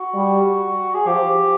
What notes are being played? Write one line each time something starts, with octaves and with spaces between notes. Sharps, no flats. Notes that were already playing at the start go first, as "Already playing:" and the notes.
Already playing: F#4
G3
G#4
F3 G4